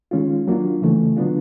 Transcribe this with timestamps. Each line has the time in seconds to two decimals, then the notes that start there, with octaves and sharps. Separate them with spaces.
0.11 D#3 G#3 C#4 F4
0.48 F#3 A#3 D4 F4
0.82 C#3 E3 A3
1.17 D3 F#3 B3 D4 F4